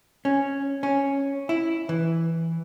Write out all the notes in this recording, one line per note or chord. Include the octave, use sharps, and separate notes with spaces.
C#4
C#4
E4
E3